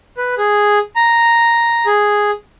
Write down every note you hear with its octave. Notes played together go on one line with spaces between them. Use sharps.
B4
G#4
A#5
G#4